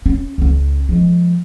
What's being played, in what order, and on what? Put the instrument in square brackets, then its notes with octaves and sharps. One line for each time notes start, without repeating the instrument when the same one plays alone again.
[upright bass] C#4
C#2 C#4
F3 G#3